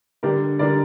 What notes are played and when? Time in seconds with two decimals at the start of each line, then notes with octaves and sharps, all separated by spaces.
0.23 D3 G3 D4 G4 A#4
0.59 D3 G3 D4 A#4 D5